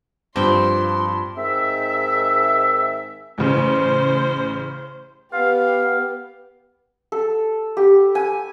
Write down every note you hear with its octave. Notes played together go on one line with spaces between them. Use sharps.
G2 F3 C4 G5 B5 C6
G#2 D#3 C4 E5
A1 C#3 C5
B3 G4 F5
A4
G4
G#5